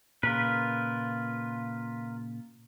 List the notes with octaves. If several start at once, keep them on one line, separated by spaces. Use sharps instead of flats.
A#2 C#3 F4 A#4 B4